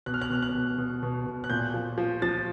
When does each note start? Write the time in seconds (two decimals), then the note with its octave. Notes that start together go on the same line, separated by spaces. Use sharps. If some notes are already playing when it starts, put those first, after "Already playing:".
0.06 B2 F#6
0.14 F6
0.22 F#6
0.30 B2 F6
0.42 F#6
0.55 B2
0.78 B2
1.03 B2
1.27 B2
1.44 F#6
1.50 A#2 G6
1.74 F3
1.98 F3
2.22 F3 A6